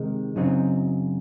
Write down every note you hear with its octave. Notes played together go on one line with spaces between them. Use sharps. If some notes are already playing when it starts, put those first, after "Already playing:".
Already playing: C3 D#3 G#3 D#4
F#2 C#3 F#3 C4 D#4